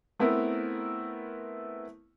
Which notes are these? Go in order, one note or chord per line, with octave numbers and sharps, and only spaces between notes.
A3 B3 C4 E4 A#4